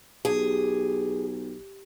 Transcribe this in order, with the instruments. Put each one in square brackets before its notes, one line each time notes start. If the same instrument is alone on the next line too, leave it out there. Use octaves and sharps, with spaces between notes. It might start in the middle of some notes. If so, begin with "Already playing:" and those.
[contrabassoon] B1 [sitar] G4 [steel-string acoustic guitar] G#4